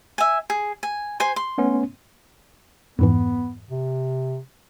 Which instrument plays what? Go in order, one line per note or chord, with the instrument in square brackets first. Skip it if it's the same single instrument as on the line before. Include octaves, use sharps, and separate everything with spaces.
[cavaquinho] E5 G#5
G#4
G#5
C5 G#5 C6
C6
[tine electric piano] A3 B3 C#4
[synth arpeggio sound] F2 G#2 E3 [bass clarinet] B3
[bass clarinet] C3